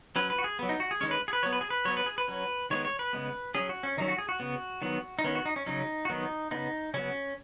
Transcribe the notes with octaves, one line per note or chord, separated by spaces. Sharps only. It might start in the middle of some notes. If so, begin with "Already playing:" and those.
F#3 C#4 B4
B4
F#4
G#4
F#3 B3
D#4
F#4
G#4
D#3 G#3 C#4 C#5
B4
G#4
B4
F#3 B3 C#5
B4
G#4
B4
F#3 B3 C#5
B4
G#4
B4
F#3 C#4
D#3 G#3 B3 C#5
C#5
B4
C#3 G#3 B3
F#3 C#4 G#4
F#4
C#4
D#3 F#3 C#4 D#4
F#4
G#4
F#4
C#3 B3
D#3 F#3 B3
D#4
D#3 B3 C#4
F#4
D#4
C#4
C#3 F#3 C#4 D#4
F#4
D#3 F#3 B3 D#4
C#3 B3 D#4
C#3 F#3 B3 C#4